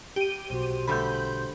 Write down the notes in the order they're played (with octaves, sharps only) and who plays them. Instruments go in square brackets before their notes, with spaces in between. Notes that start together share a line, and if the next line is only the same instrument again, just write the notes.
[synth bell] G4 D#7
[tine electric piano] B1 B2 F#4 [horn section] C5
[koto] D3 G3 A3 [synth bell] B5 G6